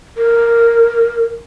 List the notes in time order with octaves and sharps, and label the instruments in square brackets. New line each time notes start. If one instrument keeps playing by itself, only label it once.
[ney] A#4